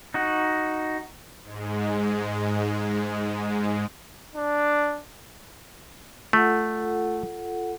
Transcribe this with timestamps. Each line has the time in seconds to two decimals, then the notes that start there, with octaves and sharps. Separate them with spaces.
0.14 D#4 F#4
1.43 G#2 G#3
4.36 D4
6.33 A3 F4 A4 F#5